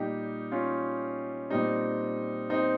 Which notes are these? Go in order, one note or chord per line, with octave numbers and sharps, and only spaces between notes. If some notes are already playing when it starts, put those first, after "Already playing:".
Already playing: A#2 G3 D#4 G4
C#4 F4
A#2 G3 C4 D#4
C4 D#4